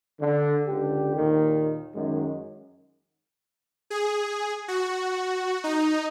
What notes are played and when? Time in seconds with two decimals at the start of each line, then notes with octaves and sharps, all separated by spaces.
0.20 D3
0.67 C#2 D3 G4
1.16 D#2 A#2 D#3
1.95 F#2 D#3 G#3
3.90 G#4
4.68 F#4
5.64 D#4